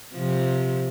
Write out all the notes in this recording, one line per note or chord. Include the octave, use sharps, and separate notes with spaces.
C3 F3